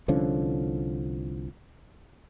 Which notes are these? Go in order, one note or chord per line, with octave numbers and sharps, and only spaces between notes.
C2 D3 F3 C#4